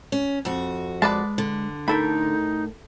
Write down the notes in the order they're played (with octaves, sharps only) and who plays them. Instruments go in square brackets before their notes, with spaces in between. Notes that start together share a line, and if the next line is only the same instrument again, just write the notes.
[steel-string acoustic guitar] C#4
F2 F#4
[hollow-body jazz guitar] G#3 [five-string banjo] B4 D5 A5
[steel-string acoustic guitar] D3
[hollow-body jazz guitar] A2 A4 A#4 [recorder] D#4 [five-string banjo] B5